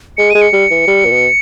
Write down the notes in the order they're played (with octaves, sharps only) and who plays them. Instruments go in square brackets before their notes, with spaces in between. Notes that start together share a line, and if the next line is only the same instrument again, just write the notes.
[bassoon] G#3 [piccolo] C#7
[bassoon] G#3 [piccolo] D#7
[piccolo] C#7
[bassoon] G3
E3
G3
A#2
B2